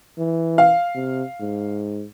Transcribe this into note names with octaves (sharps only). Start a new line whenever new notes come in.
E3
F5
C3
G#2